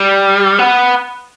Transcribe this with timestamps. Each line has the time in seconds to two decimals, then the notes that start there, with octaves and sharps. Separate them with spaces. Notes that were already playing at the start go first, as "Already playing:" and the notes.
Already playing: G3
0.59 B3